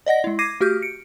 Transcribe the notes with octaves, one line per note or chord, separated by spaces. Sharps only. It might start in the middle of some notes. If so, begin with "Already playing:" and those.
D5 D#5 F#5 A#6
G#3 E4
D6 G#6 A#6 C7 D#7
A3 F#4 G4 F6 G6
C#7 D7